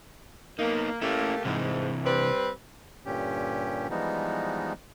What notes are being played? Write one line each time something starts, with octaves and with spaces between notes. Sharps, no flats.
A#3 B3 D#4
A3 A#3 C#4 E4 G4
G#2 C3 E3
G3 C4 B4
G2 A#2 D3 C#4 G4
E3 F3 G3 G#3 B3 D#4